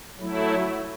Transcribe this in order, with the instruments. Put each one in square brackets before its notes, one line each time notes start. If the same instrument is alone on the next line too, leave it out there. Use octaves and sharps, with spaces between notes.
[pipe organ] F#3 A3 E4